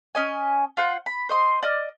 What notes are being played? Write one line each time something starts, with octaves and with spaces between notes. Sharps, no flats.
C#4 D#5 G#5
F4 C5 F#5
B5
C5 D#5 C6
D5 D#5 F6